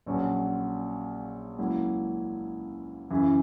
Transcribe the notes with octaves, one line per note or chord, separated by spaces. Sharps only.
A#1 A#2 F#3 C#4 F#4
C#2 C#3 F#3 A#3 E4
F#2 C#3 E3